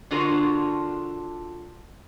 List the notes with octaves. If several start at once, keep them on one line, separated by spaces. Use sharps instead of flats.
D3 D4 F4 F#4 A#4 C5